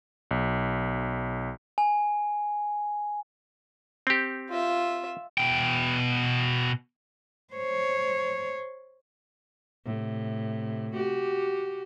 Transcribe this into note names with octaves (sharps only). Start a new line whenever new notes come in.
B1
G#5
C4 G4
F4 E5
B2 G5
C5 C#5
A2 C3
F#4 G4